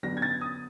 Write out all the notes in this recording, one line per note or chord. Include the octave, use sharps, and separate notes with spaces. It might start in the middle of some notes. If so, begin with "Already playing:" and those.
D3 F#3 B3 D4 A#6
G#6
A6
D#6